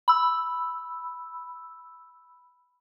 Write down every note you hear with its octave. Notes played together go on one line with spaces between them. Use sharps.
B5 E6